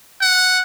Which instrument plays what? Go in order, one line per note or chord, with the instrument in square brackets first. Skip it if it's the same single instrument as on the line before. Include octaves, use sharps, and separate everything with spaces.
[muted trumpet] F#5